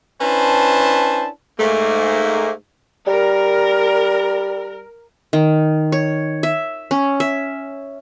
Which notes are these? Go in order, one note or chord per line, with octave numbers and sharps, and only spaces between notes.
C#4 D4 E4 B4 C5 A5
G#2 A3 A#3
G3 A#4
D#3
C#5
E5
C#4
E5